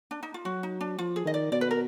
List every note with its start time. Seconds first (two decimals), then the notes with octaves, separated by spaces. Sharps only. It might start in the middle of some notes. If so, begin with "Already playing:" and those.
0.11 D4
0.23 D#4
0.34 F4
0.45 F#3 F#4
0.63 D#4
0.81 D4
0.98 F3 F4
1.16 G#4
1.25 D#3 D#5
1.34 D5
1.51 B2 D5
1.61 B4
1.71 A#4